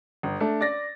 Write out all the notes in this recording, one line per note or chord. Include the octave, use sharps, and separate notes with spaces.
G1
A3 D4
D5 A6 A#6